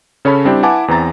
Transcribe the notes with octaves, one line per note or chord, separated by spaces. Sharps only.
C#3 C#4 A4 C#5 A5 B5
G3 C4 D4 E4 G4
E4 B4 F#5 G#5 A5 D6
E2 E3 C4 A#5 A6